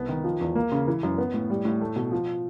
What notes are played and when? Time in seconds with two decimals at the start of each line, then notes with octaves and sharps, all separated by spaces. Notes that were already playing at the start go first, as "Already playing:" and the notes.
Already playing: C2 B3
0.09 D#3
0.24 F3
0.41 E2
0.55 A#3
0.72 C#3
0.88 E3
1.03 F#2
1.18 B3
1.34 A2
1.50 G3
1.65 A2
1.81 A3
1.96 B2
2.12 F3